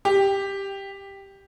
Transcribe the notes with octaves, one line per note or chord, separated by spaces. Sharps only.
G4